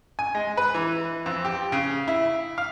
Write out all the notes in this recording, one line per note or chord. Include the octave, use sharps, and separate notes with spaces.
G#5
G#3
B4
E3
F2
G4
C#3
E4
F5